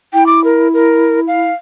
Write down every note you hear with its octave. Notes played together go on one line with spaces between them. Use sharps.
E4 G5
D6
A#4
A#4
F5